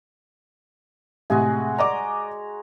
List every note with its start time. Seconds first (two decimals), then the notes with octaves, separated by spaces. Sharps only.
1.30 A2 C3 G#3 F#4 G#4
1.78 D5 D#5 A#5 D6